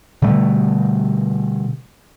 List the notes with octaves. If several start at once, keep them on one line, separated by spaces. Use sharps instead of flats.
B2 D3 G3 A3